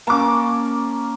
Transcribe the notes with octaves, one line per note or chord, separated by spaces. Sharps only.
A#3 C#4 A5 C#6 D6